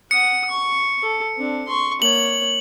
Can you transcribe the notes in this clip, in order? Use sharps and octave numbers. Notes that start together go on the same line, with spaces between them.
F#5 D#6 C#7
C#6
A4
C4 D4
C6 C#6
A#3 C#5 F#7